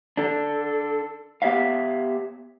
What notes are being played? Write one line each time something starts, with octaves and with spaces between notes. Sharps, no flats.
D4 A4
B3 G4 C#5 E5 F5